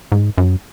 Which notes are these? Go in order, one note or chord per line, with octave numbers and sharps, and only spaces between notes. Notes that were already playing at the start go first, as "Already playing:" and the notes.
G#2
F#2